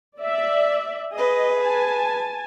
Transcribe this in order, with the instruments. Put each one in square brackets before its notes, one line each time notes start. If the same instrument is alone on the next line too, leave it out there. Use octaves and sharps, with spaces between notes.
[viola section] D5 E5
[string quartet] G#4 B4 [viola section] D#5
[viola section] G#5 A5